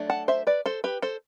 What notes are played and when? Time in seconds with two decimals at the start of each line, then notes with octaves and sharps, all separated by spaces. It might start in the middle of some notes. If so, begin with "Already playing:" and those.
Already playing: F#3 A3 D4
0.10 F#5 A5
0.28 C5 E5
0.47 B4 D5
0.66 A4 C5
0.84 G4 B4
1.02 A4 C5